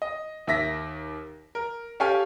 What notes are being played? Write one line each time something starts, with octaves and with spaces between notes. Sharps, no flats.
D#5
D#2 E5 A#6 B6
A#4
C#4 G4 A4 C#5 F5 G#5